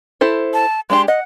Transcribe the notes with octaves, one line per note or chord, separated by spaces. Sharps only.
E4 A4 C5
A5
G#3 D4 G4 C6
D#5 F#5